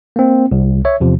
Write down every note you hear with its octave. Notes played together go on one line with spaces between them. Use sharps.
A#3 C4
C2
C#5 E5
E2 C3 F3